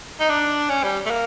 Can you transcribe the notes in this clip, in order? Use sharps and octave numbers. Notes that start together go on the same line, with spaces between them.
D#4
D4
C#4
G3
A3
A#3